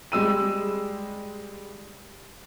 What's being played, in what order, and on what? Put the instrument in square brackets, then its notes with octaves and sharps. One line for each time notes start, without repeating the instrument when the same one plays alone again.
[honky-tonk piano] G3 G#3 E6 D#7